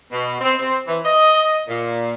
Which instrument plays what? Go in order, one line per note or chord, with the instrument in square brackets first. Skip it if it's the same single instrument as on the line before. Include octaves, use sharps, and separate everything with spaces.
[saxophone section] B2
C4
C4
E3
D#5
A#2